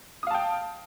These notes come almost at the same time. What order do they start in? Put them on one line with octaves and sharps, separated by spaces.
D#6 F5 A5 G5